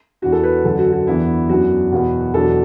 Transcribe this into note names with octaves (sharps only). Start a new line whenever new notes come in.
E2 E3 D4 F#4
A4
B4
F#2 D3 F#3 D4 A4
F#4
F#4
E2 E3 B3 D4 E4
F#2 F#3 B3 D4 F#4
E2 B2 F#3 B3
E2 B2 F#3 B3 D4 A4